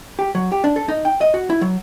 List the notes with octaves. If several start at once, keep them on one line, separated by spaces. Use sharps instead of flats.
G4
F#3
G4
D4
A4
D#4
G5
D#5
F#4
E4
F#3